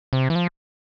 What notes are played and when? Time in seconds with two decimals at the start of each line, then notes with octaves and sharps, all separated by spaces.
0.13 C3
0.30 E3
0.35 F3